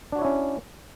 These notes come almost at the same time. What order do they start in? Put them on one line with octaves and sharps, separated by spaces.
D4 F#4 C#5 E4 C#4